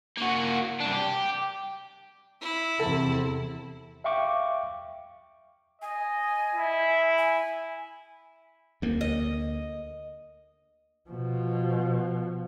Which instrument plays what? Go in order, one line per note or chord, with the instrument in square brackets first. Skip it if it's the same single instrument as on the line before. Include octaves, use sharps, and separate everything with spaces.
[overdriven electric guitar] A#3 F#4
C2 D4
G4
[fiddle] E4
[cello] E2 C3 [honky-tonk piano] A4
[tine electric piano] E5 F5 G5 C#6 D6
[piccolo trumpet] D#5 [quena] G#5
[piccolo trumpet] E4
[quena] G#5
[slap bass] D2 A#3
[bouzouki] D#5
[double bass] B2 F3